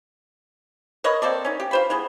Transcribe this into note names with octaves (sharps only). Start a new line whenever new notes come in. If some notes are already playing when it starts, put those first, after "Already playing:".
A#4 B4 C#5 D#5
A#3 C4 A4 D5
C#4 D#4
G4
F4 C5 B5
E3 G#3 B3